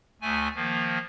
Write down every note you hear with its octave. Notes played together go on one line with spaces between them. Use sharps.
D2 A3 G#5
D#3 F3 A#3